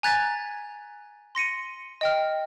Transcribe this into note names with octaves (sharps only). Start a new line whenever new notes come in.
G#5 A#5 F#6 G#6 A6 B6
C6 A#6 C#7 D#7
D#5 G5 F6